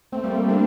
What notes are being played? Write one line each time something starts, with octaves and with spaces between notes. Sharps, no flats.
A3 C4
G3 A#3
A#3 D4